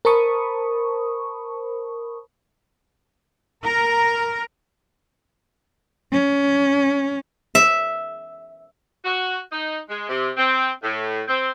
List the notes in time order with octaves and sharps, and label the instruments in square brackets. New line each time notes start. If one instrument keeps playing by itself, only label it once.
[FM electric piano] A#4 C5 A5 B5 C#6 D#6
[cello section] A#4
[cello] C#4
[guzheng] E5
[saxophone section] F#4
D#4
G#3
C3
C4
A2
C4